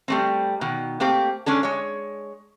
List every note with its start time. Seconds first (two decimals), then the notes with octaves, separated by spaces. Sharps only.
0.08 G3 A3 C4
0.61 B2 D#3
1.00 A3 A#3 C4 G4
1.46 G#3 C#4 D4 A4
1.63 G#3 C#5